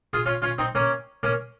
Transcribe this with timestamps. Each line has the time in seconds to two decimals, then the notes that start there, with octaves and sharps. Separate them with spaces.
0.13 F4 G#4
0.26 C#4 F4
0.42 C#4 F4
0.58 C4 D#4
0.75 A#3 C#4
1.23 A#3 C#4